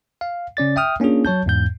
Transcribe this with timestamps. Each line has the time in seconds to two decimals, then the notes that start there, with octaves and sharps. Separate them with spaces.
0.21 F5
0.57 C#3 C#4 D5 A6
0.76 E5 G5 D#6 F6
1.00 A#3 C#4 D4 F4 G#4
1.25 F#3 C#5 A5 G6
1.46 E2 G#2 G6